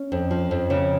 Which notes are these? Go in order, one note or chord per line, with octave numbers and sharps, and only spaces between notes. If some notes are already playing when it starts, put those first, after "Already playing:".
Already playing: C#4
F2
F3
F2
C#3